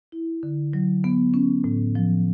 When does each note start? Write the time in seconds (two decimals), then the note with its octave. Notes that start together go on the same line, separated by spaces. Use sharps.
0.12 E4
0.43 D3
0.73 F#3
1.04 B3
1.34 C#4
1.64 A2
1.95 F3